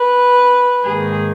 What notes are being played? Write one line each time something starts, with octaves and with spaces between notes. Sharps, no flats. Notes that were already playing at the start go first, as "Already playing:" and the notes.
Already playing: B4
G#2 D#3 A#3 G#4